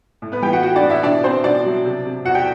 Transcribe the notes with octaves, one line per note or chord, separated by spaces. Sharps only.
A2
B3 B4
E3 G4 G5
F#4 F#5
A2 F#4 F#5
D4 D5
A2
E4 E5
B2 D4 D5
B2 C4 C5
B2 D4 D5
F#3
C3
C3
E2 F#4 F#5
G4 G5